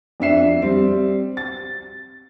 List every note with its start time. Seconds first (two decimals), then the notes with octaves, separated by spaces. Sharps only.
0.20 F2 D4 E5 C7 E7
0.62 G3 C4
1.37 A6